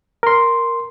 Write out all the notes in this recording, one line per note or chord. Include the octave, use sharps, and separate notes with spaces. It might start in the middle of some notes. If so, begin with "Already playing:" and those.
A#4 C6